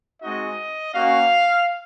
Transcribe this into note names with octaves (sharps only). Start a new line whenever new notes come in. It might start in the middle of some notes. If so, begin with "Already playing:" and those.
G#3 C4 D#4 F#4 D#5
A#3 C#4 F#4 F5